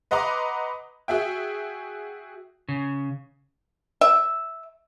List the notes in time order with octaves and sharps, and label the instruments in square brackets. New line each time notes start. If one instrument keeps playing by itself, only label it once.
[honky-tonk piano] B4 D#5 F#5 A#5 C6 D6
F#4 G#4 E5 G5
[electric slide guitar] C#3
[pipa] E5